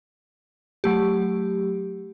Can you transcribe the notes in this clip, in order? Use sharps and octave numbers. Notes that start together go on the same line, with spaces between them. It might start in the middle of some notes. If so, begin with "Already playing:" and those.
F#3 A3 G4